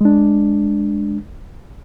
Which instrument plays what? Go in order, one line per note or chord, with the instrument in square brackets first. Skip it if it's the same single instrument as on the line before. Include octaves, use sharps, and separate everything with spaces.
[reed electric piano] G#3 D4